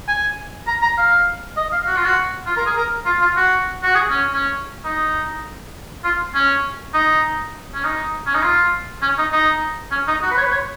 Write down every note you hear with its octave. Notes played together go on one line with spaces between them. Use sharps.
G#5
A#5
A#5
F5
D#5
F5
F#4
F4
F#4
F4
A#4
G#4
A#4
F4
F4
F#4
F#4
G#4
C#4
C#4
D#4
F4
C#4
D#4
C#4
D#4
C#4
D#4
F4
C#4
D#4
D#4
C#4
D#4
F#4
B4
C#5
B4
C#5